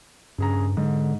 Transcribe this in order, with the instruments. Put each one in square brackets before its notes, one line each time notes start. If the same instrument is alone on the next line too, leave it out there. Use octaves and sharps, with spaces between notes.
[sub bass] G2 [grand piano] C#3 G#4 A#5
[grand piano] G#2 [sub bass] D3